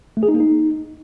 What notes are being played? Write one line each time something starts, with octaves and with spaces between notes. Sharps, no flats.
A3
G#4
D#4
A#3
D#4